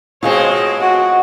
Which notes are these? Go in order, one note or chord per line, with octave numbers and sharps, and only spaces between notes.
B2 G#3 C4 F4 G#4 C#5
F#4 F#5